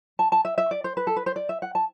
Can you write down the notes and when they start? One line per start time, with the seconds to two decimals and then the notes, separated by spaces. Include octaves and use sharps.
0.19 A5
0.32 A5
0.45 E5
0.58 E5
0.71 D5
0.84 C5
0.97 B4
1.07 A4
1.16 B4
1.26 C5
1.36 D5
1.49 E5
1.62 F#5
1.75 A5